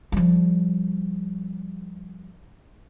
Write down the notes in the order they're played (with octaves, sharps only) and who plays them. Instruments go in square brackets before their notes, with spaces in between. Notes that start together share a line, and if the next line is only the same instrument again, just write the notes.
[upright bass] F3 G3